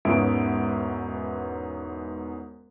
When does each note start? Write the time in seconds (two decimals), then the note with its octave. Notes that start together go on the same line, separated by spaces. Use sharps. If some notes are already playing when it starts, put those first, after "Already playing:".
0.05 E1 G#2 B3 C#4 E5 D7